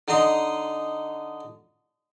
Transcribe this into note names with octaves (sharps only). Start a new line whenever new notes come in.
D3 D#4 D#5 A#5 C6 D#6